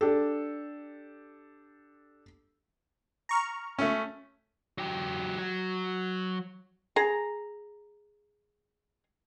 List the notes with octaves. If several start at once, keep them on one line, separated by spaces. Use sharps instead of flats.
D4 G4 A4
A#5 C#6 F6
A3 C#4
F#3 G4
F#3
G#4 A#5